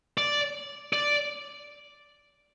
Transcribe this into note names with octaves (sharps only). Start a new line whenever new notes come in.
D5
D5